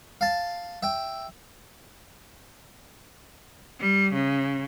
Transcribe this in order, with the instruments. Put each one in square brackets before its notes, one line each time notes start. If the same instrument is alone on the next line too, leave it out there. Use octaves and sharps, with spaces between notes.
[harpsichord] F5 A5
E5 G5
[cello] G3
C#3